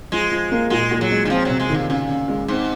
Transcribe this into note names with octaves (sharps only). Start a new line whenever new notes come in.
F3 G#3
F3
A#3
A#2 G#3
A#2
F#3
G#3
D#3
F3 C4
C3 F#3
G#3
A#2 D#3
A#2 C#3
C#3
G#3
G#2 C4